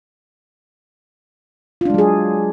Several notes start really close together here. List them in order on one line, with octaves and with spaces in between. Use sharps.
F4 D4 G#3 F#3 G#4